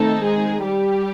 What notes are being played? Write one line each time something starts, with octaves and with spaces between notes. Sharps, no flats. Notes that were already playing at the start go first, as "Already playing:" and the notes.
Already playing: D#3 A3 C4 D#4 A4
G#3 G#4
G3 G4